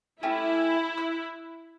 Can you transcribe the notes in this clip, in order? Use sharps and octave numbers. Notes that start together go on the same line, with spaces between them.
A3 C#4 E4 G4
E6 F#6